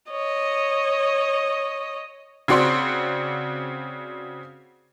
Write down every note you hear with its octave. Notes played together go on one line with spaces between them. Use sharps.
C#5 D#5
C#3 C4 F#4 D5 C6